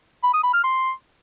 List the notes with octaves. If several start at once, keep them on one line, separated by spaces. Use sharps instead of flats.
B5
D#6
B5
F6
C6